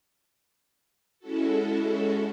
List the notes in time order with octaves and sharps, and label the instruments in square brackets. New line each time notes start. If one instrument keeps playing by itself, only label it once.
[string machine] G#3 C#4 E4 F#4 A4